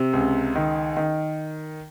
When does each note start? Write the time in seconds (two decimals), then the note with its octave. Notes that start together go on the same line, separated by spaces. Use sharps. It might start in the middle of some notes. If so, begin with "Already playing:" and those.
Already playing: C3
0.13 C#2
0.55 D#3
0.97 D#3